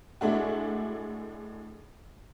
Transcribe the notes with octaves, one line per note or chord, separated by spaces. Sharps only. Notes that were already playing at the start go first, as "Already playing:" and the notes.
A2 G#3 A3 D4 F#4